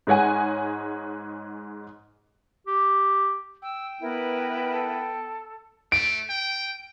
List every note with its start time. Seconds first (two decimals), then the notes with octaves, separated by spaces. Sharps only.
0.07 G#2 G#3 C#5 F#5 G#5
2.67 G4
3.62 G5 E6
4.01 B3 E4 A#4 B4
4.71 A4
5.92 A3 D7
6.30 G5